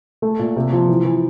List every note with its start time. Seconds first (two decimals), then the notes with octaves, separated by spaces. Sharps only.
0.22 A3
0.39 A#2
0.56 C3
0.73 F3
0.88 E3
1.05 E3